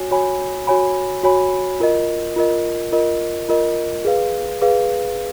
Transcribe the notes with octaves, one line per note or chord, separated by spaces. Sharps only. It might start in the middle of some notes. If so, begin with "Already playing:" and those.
Already playing: F#4 C#5 G#5
F#4 C#5 G#5 B5
F#4 C#5 G#5 B5
F#4 C#5 G#5 B5
F4 A#4 D#5
F4 A#4 D#5
F4 A#4 D#5
F4 A#4 D#5
G#4 B4 F5
G#4 B4 F5